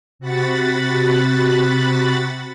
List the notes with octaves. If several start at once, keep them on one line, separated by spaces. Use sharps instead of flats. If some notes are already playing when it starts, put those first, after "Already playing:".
C3 F#4 F#5 B5 A6